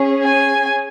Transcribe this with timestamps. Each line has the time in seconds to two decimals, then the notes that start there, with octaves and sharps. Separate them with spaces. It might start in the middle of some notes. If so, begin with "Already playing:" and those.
Already playing: C#4 G#4
0.24 G#5